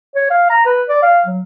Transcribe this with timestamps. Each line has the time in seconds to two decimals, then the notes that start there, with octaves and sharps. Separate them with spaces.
0.16 C#5
0.30 F5
0.50 A#5
0.66 B4
0.88 D5
1.02 F5
1.26 F#3